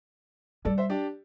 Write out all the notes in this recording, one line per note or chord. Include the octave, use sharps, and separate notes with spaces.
G3 A4 D5
C5 E5
D4 G4